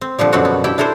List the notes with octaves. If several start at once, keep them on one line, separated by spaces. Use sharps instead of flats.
C4
A#2 D3 F3 G3
F#2 B2 D3 C4 F#4 F#5
B3
E4 G4 G5 A5 B5
D4 E4 A4 A#4 C5